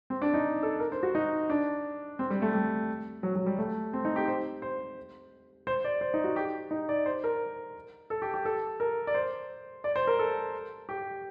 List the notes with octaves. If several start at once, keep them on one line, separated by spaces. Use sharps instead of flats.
C4
D4
D#4
A4
A#4
C5
F#4
D#4
D4
C4
G3
A3
G3
F#3
F#3
G3
A3
C4
D#4
G4
C5
C5
C5
D5
C5
D#4
F#4
G4
D#4
D5
C5
A#4
A4
G4
G4
A4
A#4
D5
C5
D5
C5
A#4
A4
G4